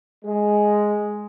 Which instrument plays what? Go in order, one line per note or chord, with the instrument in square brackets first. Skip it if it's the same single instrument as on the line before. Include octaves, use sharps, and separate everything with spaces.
[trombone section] G#3